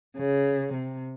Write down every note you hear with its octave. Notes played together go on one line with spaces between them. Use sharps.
C#3
C3